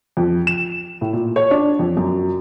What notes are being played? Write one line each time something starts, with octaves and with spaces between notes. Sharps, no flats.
F2
E7
A2
A#2
C#5
D4
F2
F#2